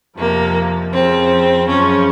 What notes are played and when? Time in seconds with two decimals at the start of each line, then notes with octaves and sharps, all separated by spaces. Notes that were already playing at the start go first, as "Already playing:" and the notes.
0.17 F2 C3 F3 A#3
0.93 F2 C#3 F3 C4
1.67 F#2 C#3 F3 C#4